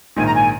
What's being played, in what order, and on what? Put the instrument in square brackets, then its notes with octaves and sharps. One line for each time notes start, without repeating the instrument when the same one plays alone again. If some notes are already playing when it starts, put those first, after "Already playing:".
[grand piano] A#1 G#2 D#3 A#3 [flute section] G#5
[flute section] A#5
G#5